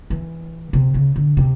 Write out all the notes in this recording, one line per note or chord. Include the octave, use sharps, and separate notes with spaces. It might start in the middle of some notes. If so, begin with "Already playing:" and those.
E3
C3
C#3
D3
C3